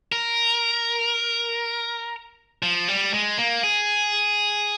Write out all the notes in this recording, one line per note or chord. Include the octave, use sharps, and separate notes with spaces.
A#4
F3
G3
G#3
A#3
G#4